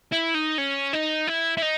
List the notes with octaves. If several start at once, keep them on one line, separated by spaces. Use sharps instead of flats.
E4
D#4
C#4
D#4
E4
E4
D#4